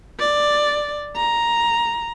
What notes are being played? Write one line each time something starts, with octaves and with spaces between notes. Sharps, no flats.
D5
A#5